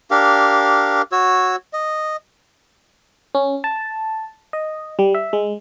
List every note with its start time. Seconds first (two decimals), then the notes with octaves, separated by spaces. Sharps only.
0.11 D4 G4 A#4 F5
1.12 F#4 C#5 E6
1.73 D#5
3.35 C#4
3.64 A5
4.53 D#5
4.99 G3
5.15 E5
5.33 G#3